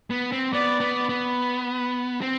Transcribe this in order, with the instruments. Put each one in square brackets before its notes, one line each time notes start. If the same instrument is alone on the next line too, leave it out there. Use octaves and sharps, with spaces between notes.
[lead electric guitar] B3
C4
[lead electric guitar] B3 [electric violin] D5
[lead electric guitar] B3
B3
C4